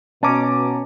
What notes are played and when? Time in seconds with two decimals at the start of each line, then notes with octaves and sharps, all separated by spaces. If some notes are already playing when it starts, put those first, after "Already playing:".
0.23 B2 C#4 A5 A#5 D6